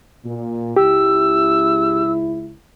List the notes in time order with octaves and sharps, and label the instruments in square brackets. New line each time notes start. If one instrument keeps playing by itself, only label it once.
[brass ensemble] A#2
[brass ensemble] C#2 E4 [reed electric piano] G4 [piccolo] E6